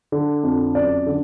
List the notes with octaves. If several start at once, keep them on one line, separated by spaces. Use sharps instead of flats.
D3
F2
F#2 D5
D3